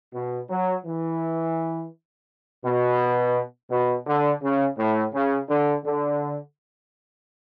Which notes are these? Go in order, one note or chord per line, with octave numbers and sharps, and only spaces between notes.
B2
F#3
E3
B2
B2
D3
C#3
A2
C#3
D3
D3